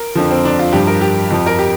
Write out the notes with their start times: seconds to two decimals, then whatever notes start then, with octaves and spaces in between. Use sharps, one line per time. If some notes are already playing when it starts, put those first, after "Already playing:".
Already playing: A#4
0.15 F2 D3 F3
0.31 C4
0.45 D4
0.59 F4
0.73 G2 F3 G4
0.87 A#4
1.01 G4
1.30 F2 F3
1.46 A#4
1.59 G4